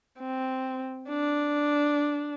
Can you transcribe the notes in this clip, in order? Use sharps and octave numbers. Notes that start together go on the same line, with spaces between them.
C4
D4